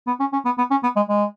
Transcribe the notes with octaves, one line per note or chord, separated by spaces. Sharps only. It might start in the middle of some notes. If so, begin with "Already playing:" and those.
B3
C#4
C#4
B3
B3
C#4
B3
G#3
G#3